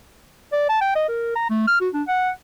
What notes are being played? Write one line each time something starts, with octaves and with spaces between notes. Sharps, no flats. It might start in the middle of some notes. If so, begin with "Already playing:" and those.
D5
A5
G5
D#5
A#4
A#5
A3
F6
F#4
D4
F#5